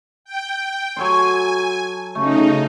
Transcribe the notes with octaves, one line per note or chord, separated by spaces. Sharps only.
G5
F#3 A4 G#5 C6
C#3 A3 D#4